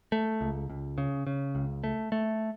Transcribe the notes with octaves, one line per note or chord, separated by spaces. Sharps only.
A3
C#2
C#2
C#3
C#3
C#2
A3
A3